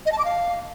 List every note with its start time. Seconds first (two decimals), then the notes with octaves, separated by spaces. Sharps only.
0.06 D#5
0.12 A5
0.18 D6
0.25 F5